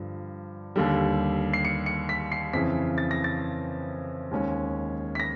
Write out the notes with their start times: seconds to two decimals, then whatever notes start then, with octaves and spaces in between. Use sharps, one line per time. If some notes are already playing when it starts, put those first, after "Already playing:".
Already playing: G2 D3 F3
0.76 D#2 D3 G3
1.54 C7
1.65 C#7
1.86 C#7
2.09 B6
2.32 C7
2.53 F2 C#3 E3 B6
2.98 A6
3.11 A#6
3.24 A6
4.31 D#2 D#3 G#3 C#4
5.15 B6
5.20 A#6